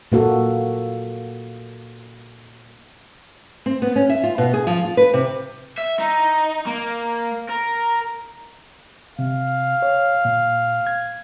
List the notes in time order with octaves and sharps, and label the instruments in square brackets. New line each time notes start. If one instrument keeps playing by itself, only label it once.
[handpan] A#2 A#3 F#4 A4
[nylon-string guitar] C4
B3
C#4
E5
F4
B2
G#4
F3
F4
B4
C3
[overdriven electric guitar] E5
D#4
A#3
A#4
[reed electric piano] C3 [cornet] F5
[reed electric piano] C#5
A#2
G#6